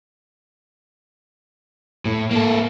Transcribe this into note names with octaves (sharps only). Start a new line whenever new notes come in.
A2
A#3 A4